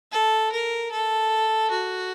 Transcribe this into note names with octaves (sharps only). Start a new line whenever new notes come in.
A4
A#4
A4
F#4